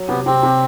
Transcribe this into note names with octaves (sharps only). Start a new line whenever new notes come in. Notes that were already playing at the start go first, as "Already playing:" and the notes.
Already playing: F#3
C3 B3
C3 C4
C3